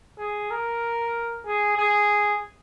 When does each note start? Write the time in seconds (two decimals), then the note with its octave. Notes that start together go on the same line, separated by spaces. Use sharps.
0.19 G#4
0.50 A#4
1.46 G#4
1.77 G#4